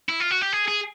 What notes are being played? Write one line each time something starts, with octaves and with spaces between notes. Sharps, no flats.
E4
F4
F#4
G4
G#4
G#4